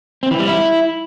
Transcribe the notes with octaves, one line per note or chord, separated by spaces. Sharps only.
C4
E3
G3
E4